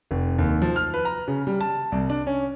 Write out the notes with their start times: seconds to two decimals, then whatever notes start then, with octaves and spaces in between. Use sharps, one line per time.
0.11 F1
0.39 D#2
0.62 F3
0.76 F6
0.94 B4
1.05 A#5
1.28 C#3
1.47 G3
1.61 A5
1.92 C2
2.10 D4
2.27 C#4